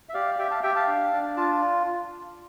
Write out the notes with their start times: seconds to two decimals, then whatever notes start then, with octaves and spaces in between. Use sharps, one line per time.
0.09 E5
0.14 G4 D5 F5
0.38 G4 E5 G5
0.51 F5 A5
0.63 G4 E5 G5
0.76 F5 A5
0.87 D4
1.13 D4
1.37 F4 A5